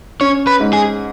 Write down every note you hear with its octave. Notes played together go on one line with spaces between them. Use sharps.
C#4 C#5
B4
G#2
G#4